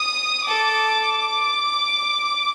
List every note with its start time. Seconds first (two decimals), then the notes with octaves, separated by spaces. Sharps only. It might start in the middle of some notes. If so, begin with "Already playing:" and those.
Already playing: D#6
0.48 A4 D6